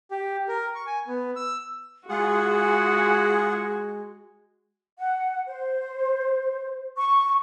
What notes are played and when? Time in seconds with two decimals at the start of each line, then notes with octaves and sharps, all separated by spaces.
0.11 G4
0.48 A#4
0.75 C#6
0.87 G#5
1.07 B3
1.36 E6
2.09 G#3 F4 F#4 G#4 F#5
4.97 F#5
5.46 C5
6.96 C#6